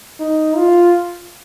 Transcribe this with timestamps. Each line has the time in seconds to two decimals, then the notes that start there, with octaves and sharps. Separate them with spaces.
0.20 D#4
0.57 F4